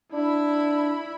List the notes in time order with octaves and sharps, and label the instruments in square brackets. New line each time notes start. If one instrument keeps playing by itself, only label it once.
[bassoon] D4 [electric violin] E4 B5